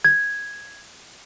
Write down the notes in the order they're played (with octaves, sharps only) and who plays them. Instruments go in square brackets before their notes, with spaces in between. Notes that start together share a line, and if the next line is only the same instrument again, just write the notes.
[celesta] G#6